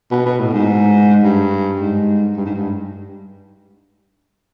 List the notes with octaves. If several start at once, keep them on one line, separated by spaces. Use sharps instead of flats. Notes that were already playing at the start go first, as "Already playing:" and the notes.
B2
B2
A2
G#2
G2
G#2
G2
G#2
G2